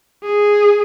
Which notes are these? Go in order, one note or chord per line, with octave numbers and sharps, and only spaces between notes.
G#4